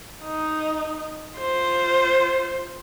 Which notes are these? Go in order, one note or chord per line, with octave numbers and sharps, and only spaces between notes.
D#4
F4 C5